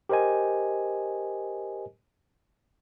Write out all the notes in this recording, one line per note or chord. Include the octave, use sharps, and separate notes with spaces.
G4 A#4 C5 D#5 G#5